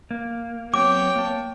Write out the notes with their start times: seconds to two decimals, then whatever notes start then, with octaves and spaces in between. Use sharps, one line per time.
0.11 A#3
0.74 F#3 B3 C4 C#5 G5 D6
1.16 A#3 A5